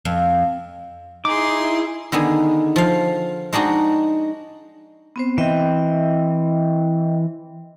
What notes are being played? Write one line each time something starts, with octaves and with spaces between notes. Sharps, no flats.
F2
D#4 E4 G#4 C6 D6
D3 D#3 B3 G#4
F3 F5
G#3 D4 D#4 F#4 G5
B3 C4 C5
E3 C4 D#5 E5 G5